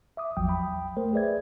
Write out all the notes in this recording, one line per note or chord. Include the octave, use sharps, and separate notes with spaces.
E5 D6 D#6
A1 E2 F3 F#3 G5 D#6
G5 B5
A3 A#4 C5
G#4 B4 D5 E5 G#6